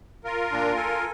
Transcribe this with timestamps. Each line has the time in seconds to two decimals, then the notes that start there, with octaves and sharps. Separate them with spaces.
0.24 F4 A#4
0.52 A#2 D4
0.76 A4 G#5